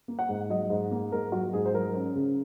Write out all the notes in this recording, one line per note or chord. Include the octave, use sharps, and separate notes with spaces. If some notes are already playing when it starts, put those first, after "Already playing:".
A#3
F#5
G#2
F#3 D#5
G#2
A#3
G#2 A#4
F#3 F#4
G#2 G#4
C5
F#3 A#4
C#4
C#3